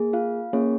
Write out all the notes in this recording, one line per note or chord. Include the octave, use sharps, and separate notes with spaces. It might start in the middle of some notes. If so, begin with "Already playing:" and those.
Already playing: A#3 G#4
F4 F5
A#3 C#4 F4 G#4 C#5